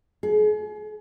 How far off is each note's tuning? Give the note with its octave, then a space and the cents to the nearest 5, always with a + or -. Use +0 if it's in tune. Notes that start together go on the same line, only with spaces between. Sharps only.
G#4 +35